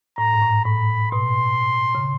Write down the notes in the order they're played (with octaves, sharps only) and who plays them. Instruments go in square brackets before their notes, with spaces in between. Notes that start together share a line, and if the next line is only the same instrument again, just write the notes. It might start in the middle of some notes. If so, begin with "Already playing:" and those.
[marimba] A2 [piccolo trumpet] A#5
[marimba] G#2
A2
[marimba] A2 [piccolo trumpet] B5
[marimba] B2 [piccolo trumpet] C6
[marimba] C#3